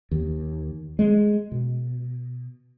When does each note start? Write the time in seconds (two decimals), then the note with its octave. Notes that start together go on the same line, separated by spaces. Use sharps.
0.11 D#2
0.99 G#3
1.52 B2